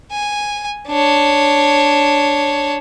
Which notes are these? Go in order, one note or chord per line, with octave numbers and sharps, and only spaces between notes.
G#5
D4 C#5